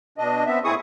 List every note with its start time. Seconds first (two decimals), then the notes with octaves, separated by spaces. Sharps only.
0.18 B2 D4 D#5
0.46 B3 C4 E5
0.64 A2 C4 E4 G#4 C#6 D#6